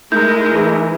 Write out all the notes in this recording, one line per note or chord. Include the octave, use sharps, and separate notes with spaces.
G#3 A3 D#4 E4 A#4 G6
E3